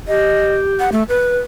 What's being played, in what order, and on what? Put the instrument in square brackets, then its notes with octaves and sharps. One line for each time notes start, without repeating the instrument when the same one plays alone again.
[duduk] G4 [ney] D#5
[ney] F#5
A3
B4